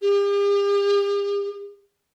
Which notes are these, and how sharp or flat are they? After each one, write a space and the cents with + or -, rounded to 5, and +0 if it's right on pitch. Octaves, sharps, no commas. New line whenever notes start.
G4 +45